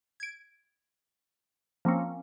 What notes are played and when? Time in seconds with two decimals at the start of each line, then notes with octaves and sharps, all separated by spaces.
0.20 G#6 D7
1.85 F3 A#3 C4 C#4